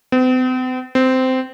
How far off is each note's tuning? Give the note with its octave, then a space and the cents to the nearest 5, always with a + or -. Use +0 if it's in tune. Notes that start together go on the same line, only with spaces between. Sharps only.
C4 -45
C4 -15